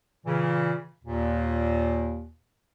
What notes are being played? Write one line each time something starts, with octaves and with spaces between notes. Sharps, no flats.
A#2 C#3 E3
D#2 A#2